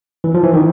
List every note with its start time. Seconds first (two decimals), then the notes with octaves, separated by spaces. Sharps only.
0.24 E3
0.34 F3
0.44 E3
0.54 D#3